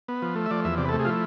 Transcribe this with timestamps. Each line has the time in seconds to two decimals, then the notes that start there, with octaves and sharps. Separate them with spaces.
0.08 B3
0.22 F3
0.36 A3
0.46 E5
0.51 F3 D5
0.65 E2 E5
0.78 C3 D5
0.85 B4
0.89 A4
0.93 A3
0.99 G#4
1.05 F3 E4 F4